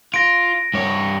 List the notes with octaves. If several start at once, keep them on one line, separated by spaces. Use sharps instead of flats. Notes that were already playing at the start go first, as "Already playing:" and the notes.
F4 A#6 D7
G2 C#5